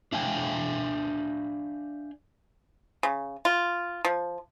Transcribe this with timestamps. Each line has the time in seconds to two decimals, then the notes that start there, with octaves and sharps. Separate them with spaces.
0.12 D4 E5 F5 G5 G#5
3.03 C#3
3.45 F4
4.05 F3